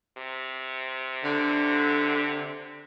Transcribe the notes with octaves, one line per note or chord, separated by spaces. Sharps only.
C3
D3